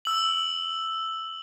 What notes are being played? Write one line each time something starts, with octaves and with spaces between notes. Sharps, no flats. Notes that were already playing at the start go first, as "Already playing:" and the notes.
E6 F#7